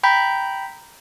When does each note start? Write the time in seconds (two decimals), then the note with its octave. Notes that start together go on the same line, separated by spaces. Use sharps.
0.03 G5 A#5 B5 G6 B6